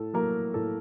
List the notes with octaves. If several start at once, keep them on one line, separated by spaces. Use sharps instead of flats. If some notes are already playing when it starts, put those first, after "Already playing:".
Already playing: A2 A4
F#3 A#3 A#4
A2 A4